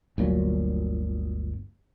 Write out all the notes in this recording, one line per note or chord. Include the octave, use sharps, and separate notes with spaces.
G1 D2 A#2 F#3